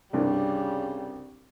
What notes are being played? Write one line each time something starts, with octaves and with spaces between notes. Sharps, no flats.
C2 G2 C#3 G3